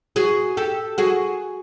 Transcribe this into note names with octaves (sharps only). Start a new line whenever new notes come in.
F#4 G#4
G4 A4
F#4 G#4